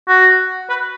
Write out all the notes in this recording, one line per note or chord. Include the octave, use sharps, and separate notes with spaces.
F#4
B4